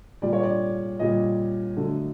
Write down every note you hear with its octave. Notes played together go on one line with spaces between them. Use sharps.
A#2 G3 D5
C#5
D5
A#2 G3 D#5
D3 F#3 A3